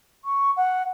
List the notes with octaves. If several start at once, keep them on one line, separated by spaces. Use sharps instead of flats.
C#6
F#5